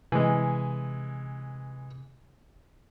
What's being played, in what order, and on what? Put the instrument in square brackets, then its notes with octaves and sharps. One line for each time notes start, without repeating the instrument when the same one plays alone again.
[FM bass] C3 [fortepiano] E3 G#3